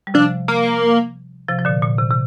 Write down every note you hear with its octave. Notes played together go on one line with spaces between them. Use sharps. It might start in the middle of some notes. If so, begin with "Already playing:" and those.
G3
C3 F3 D4
A#3
C3 F3
F3
A#2 D3
A#2
C3
C3